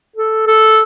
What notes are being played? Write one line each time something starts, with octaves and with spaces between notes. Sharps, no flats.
A4
A4